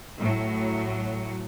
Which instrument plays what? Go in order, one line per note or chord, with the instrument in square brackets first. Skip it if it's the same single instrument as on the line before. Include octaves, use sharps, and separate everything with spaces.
[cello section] A2 F#3